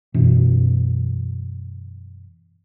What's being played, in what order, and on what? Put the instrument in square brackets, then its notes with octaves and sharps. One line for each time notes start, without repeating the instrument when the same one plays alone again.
[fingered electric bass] F#2 B2 E3